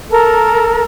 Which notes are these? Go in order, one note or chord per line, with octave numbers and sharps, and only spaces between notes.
A4 A#4